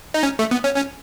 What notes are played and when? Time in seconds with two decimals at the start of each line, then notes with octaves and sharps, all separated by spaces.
0.14 D#4
0.23 C#4
0.39 A3
0.51 B3
0.64 C#4
0.76 C#4